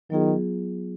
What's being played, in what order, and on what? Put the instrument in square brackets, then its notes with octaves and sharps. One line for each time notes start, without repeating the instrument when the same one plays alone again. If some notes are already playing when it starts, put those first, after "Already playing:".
[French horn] D#3 [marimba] F#3 B3 F4 G#4